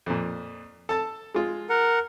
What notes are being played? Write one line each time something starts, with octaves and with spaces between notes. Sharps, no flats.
F2 A#2
A4 A5
G#3 F4
A#4 F#5